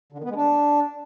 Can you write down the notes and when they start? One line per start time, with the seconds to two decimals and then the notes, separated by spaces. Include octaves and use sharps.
0.12 D3
0.18 D#3
0.24 B3
0.30 G#3
0.36 D4